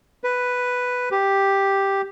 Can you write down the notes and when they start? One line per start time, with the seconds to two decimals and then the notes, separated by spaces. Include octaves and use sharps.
0.24 B4
1.11 G4